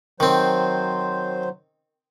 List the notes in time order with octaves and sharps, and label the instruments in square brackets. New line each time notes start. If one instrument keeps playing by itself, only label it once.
[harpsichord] D#3 C4 [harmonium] F#3 C5